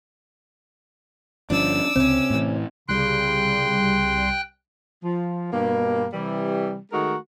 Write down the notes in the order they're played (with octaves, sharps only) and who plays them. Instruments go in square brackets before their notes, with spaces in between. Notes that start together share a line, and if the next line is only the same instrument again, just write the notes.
[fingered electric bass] G1 F3 C#4 [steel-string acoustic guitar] D4 [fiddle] D6 E6
[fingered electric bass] C#2 [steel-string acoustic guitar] C3 C#4 [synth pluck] C4
[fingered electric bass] A2 E3
[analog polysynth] C2 G3 [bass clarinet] C#3 [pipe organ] G5 F#6 [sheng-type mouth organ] C6
[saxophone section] F3
G2 B2 A#3
C3 E3 G3
D#3 G#3 A3 D#4 F#4 A#4